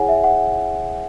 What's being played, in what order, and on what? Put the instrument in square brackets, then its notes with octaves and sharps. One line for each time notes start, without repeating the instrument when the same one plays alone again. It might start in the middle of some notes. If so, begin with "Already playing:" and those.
Already playing: [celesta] E4 G#4 C#5 F#5 G#5
E5
F#5